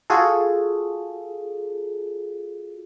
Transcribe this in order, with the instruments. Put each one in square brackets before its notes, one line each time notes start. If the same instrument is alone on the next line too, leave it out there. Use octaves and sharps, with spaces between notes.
[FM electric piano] F4 F#4 G#4 A4